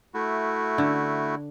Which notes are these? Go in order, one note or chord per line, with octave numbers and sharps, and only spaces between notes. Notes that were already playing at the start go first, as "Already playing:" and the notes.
A3 E4 F#4
D3